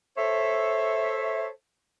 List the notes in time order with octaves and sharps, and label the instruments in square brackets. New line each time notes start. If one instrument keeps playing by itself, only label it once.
[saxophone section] A4 C5 C#5 E5